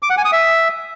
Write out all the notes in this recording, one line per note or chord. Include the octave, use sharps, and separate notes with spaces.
D6
F#5
G#5
D#6
E5